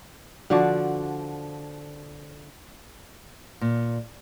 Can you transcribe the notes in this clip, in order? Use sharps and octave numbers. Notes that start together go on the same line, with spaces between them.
D3 F3 F#4 D5
A#2